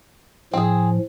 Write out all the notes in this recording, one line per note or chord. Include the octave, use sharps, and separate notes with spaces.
A2 F3 C4 G#4